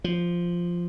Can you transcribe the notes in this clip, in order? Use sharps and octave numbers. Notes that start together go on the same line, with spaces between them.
F3